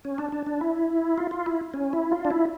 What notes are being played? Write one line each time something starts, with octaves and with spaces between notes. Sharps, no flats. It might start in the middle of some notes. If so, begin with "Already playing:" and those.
C#4
D4
D4
D4
E4
F4
F4
E4
C#4
E4
F4
D4
E4